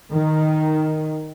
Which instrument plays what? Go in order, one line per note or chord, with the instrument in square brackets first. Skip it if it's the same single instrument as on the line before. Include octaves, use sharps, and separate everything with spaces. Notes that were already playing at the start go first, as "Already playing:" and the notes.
[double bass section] D#3